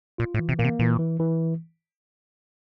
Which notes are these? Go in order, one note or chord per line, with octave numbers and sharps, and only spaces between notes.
A#2 F4
A2
E3
C3
A#2 A#3
C3
A#2 E3
E3
E3